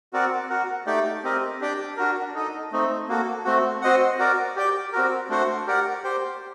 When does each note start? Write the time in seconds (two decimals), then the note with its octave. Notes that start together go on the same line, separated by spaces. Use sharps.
0.13 C4 F#4 A#4 D5 F#5
0.50 F#4 A#4 F#5
0.86 A3 D#4 G4 D5 G5
1.24 C4 G4 A#4 D#5
1.61 D4 G4 D5 G5
1.97 D4 F#4 A#4
2.34 D#4 A4 D#5
2.72 A3 C4 D#4
3.08 A#3 F#4 A4
3.45 A3 C4 F#4
3.81 C4 F#4 C5 D#5 F#5
4.18 F#4 A#4 D5
4.56 G4 D5 G5
4.93 C4 F#4 A#4
5.29 A3 D4 F#4 C5 F#5
5.67 G4 A#4 D5 F#5
6.04 G4 C5 G5